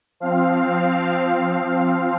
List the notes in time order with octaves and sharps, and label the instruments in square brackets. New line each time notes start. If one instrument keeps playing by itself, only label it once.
[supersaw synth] F3 C4 F5